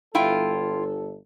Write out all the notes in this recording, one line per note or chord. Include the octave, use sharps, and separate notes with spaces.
G1 E4 F4 A4 G5